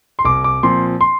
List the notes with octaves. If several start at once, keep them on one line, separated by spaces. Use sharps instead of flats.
C6
C2 D6
D6
A#2 F3 C4 C6
C6